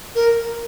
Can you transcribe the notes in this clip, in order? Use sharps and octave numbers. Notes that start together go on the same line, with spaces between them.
A#4